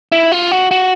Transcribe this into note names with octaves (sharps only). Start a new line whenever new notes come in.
E4
F4
F#4
F#4